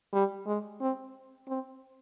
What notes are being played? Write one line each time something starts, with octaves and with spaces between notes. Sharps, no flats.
G3
G#3
C4
C4